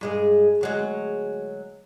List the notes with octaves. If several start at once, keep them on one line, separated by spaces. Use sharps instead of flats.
G2 G#3 G#4
D2 F#3 G#3